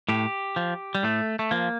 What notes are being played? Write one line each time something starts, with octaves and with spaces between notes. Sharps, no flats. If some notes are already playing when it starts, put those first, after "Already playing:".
A2 G4
F3
G3
A2 A3
A3
F3 A#3